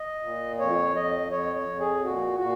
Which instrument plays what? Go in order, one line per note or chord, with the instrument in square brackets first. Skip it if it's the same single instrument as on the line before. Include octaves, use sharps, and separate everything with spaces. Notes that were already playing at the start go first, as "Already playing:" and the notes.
Already playing: [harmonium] D#5
A#2
F2 C#5
F2 D#5
F2 C#5
C#5
F2
G#4
A#2 F#4
A#2 F#4